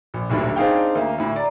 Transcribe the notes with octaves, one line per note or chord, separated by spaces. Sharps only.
A#1
D#1 B1 A2 D3
C4 D4 D#4 G#4 F5 G5
D2 A#3
D2 A2
D5 A#5